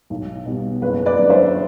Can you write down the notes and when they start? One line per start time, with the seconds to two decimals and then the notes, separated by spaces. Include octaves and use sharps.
0.10 B1
0.46 B2 G3 B3
0.82 F#1 B4
1.06 B4 D5
1.18 F#2 D3
1.30 C5 E5